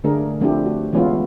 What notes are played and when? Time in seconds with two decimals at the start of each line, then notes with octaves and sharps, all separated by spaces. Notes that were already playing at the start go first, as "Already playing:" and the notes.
0.04 D3 A3 D4 G#4 A#4
0.41 F3 A3 C4 D4 E4 G4
0.66 F#4
0.93 E3 G#3 B3 C#4 E4 F4